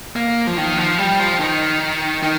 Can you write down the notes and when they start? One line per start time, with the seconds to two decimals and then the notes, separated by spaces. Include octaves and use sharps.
0.16 A#3
0.47 F3
0.57 D#3
0.78 F3
0.98 G3
1.20 F3
1.40 D#3
2.23 D#3